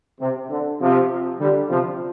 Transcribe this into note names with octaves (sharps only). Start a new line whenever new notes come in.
C3
D3
C3 F3
D3 G3
C3 F3